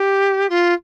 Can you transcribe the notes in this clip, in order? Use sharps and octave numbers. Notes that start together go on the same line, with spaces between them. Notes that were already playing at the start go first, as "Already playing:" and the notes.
Already playing: G4
F4